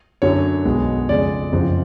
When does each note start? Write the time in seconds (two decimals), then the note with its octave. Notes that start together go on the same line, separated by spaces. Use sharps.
0.22 F#2 D3 F#3 C#5
0.65 B1 B2 G#3 B3
1.09 F2 C#3 G#3 D5
1.52 F#1 F2 C#3 F3